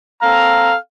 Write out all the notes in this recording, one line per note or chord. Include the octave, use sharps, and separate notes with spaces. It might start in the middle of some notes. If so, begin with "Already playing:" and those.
C4 A4 F5 A#5